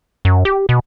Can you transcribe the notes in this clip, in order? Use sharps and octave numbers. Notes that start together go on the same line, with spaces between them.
F#2
G4
B2